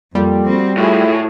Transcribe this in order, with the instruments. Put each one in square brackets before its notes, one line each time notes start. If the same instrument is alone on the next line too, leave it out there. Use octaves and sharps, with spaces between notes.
[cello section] F2 [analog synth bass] G3 [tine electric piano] A#3 F4 A4
[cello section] C4 F#4
[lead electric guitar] A2 [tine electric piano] F4 A4 [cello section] F#4 G#4